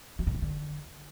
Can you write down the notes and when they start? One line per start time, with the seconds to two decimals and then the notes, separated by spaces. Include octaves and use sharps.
0.19 F#3
0.27 G2
0.34 D#3
0.42 D3